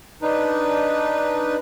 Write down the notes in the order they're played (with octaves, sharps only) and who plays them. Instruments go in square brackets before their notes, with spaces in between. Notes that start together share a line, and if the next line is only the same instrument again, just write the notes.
[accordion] D4 D#4 B4